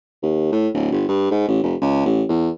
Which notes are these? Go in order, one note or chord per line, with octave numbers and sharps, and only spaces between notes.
D#2
A2
D1
G1
G2
G#2
A1
F1
C#2
A1
E2